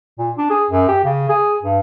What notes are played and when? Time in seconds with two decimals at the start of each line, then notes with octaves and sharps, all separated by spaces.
0.19 A#2
0.38 D4
0.50 G#4
0.70 F#2
0.88 G4
1.04 C#3
1.29 G#4
1.63 G2